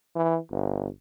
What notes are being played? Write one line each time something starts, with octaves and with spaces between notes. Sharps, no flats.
E3
G1